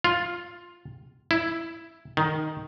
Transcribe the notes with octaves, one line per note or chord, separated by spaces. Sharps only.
F4
E4
D#3